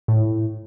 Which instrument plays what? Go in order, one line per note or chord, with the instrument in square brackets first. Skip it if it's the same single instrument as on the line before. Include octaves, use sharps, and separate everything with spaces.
[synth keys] A2